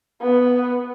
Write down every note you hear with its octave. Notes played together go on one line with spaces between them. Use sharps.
B3